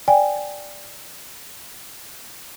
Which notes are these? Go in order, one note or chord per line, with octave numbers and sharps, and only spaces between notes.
D5 G5 G#5